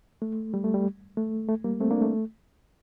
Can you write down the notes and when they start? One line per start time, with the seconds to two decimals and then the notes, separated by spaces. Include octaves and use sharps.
0.22 A3
0.54 G3
0.64 A3
0.74 G3
1.17 A3
1.49 A3
1.64 G3 A#3
1.80 A3 C4
1.91 A#3 D4
2.02 A3